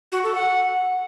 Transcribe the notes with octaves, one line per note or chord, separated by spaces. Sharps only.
F#4
A4
F#5